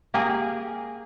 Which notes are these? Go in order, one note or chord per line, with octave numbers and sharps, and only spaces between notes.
A#3 G4 G#4